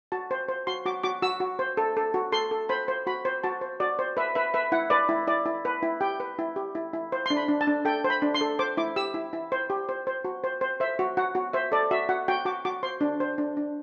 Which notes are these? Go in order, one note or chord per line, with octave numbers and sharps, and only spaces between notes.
F#4 A5
C5
C5
F#4 C6
F#4 D6
F#4 D6
F#4 E6
F#4
C5
A4
A4
F#4
A4 C6
A4
C5 B5
C5
F#4 B5
C5
F#4 A5
C5
F#4 D5
C5
B4 E5
B4 E5
B4 E5
E4 F#5
B4 D5
E4
E4 D5
E4
B4
E4
G4 G5
B4
E4
G4
E4
E4
C5
D4 C6
B5
D4
A5
D4
A4 G5
C5
B5
D4
C6
A4
C5 D6
E4 D6
G4 E6
E4
E4
C5
G4
C5
C5
F#4
C5
C5
C5 E5
F#4
F#4 F#5
F#4
C5 E5
A4 D5
F#4 E5
F#4 F#5
F#4 G5
F#4 D6
F#4 D6
C5 C6
D4
C5
D4
D4